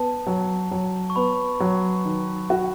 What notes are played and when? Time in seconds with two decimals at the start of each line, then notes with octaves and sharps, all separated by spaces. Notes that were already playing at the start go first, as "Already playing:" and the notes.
Already playing: B3 A5
0.27 F#3
0.71 F#3
1.10 C#6
1.16 B3 B5
1.60 F#3
2.05 D#3
2.50 F#4